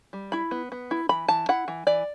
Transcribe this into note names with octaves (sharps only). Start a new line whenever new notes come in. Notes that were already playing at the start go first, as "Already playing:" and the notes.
G3
E4 B5
B3
B3
E4
E3 B5
E3 A5
E4 F#5
E3
E3 D5